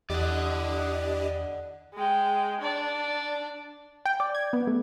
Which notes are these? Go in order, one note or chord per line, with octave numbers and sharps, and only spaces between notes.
E2 D4 E4 G4 D5 D#5 F#5
G#3 G5
D4 D5
G5
D5
G#6
B3
A3